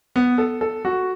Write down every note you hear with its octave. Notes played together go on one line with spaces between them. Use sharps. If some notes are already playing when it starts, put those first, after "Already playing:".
B3
A4
A4
F#4